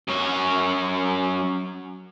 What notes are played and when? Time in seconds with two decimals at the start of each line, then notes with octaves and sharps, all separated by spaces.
0.08 F#2 C#5